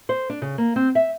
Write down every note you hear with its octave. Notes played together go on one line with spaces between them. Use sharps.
C5
D4
C#3
A#3
C4
E5